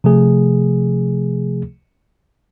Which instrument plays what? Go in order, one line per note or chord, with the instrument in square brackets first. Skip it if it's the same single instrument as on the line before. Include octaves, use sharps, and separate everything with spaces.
[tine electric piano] C3 F3 A3 G#4